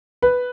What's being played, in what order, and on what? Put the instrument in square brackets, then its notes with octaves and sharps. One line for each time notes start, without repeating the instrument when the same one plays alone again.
[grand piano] B4